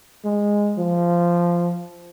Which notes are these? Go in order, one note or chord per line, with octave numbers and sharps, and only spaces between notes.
G#3
F3